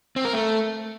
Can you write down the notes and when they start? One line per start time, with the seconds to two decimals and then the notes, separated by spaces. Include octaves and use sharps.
0.16 C4
0.25 A#4
0.33 A3